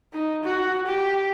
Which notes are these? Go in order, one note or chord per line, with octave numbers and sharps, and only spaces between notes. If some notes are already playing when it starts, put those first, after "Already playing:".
D#4
F#4
G4